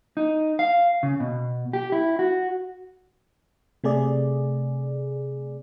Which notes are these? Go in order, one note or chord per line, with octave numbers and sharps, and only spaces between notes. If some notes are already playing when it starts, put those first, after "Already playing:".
D#4
F5
C#3
B2
G4
E4
F#4
C3 A3 G#4 D5